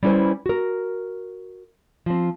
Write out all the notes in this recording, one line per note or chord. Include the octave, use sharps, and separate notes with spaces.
G3 C#4 E4 B4 C5 G#5
F#4 A#4
F3 C4